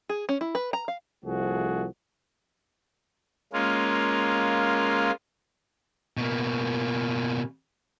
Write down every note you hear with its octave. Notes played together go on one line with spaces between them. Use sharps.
G#4
C#4
E4
B4
A#5
F5
C2 F3 A3 F#4 G#4
G#3 A#3 C#4 F4
B2 A#3